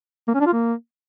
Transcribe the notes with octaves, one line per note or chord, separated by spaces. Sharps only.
A#3
C#4
D4
F4
A#3